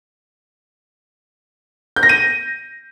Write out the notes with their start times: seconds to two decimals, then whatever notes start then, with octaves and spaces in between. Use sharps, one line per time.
1.96 G6
2.03 A#6
2.09 D#7